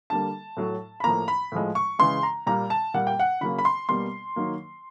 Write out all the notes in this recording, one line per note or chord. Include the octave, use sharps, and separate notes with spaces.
D3 G3 A#3 A5
A2 F#3 A3
B5
A2 F3 A#3 A#5
B5
A2 F3 G#3
C#6
C#3 E3 G#3 C6
A#5
A#2 G3 A#3 A#5
A5
A#2 G3 A#3 F#5
G5
F#5
C#3 F#3 A#3 B5
B5
C6
B2 G3 A#3 C6
D#3 F#3 A#3